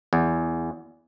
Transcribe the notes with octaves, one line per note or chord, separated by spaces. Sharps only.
E2